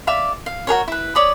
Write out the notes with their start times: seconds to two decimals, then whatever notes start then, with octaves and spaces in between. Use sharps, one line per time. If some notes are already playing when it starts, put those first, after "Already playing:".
0.07 D5 E5 F5 B5
0.46 F5
0.67 F#4 G#4 A#4 C#5
0.88 E4 B4
1.15 C#5 D5 B5 D#6